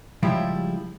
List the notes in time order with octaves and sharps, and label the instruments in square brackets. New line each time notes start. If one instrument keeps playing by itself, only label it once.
[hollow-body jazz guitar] C#3 F3 G3 G#3 E4 G4